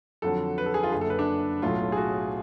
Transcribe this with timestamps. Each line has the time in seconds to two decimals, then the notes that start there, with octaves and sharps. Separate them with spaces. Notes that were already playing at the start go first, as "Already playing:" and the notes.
0.22 F2 D3 F#3 A4
0.58 B4
0.66 A4
0.74 G#4
0.83 F4
0.92 F#1 F#2 D3 G#4
1.01 A4
1.10 B4
1.19 D4
1.62 B1 A2 F#3 A3 F4
1.92 G#4
1.97 F#4